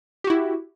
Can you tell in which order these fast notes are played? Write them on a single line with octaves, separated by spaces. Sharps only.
G4 F#4 E4